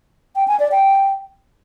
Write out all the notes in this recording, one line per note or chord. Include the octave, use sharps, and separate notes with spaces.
G5
G#5
D5
G5